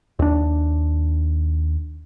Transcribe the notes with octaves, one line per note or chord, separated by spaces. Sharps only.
D#2 D4